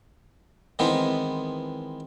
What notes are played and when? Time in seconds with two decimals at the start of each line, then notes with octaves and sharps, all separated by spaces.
0.79 D#3 E3 G#3 B3 C4